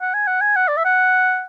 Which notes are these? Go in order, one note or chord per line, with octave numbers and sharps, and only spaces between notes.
F#5
G#5
F#5
G#5
F#5
D5
E5
F#5